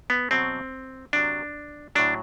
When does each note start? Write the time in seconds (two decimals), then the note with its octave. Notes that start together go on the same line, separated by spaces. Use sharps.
0.10 B3
0.31 B2 F#3 C4
1.13 C3 F#3 D4
1.95 A2 F#3 D4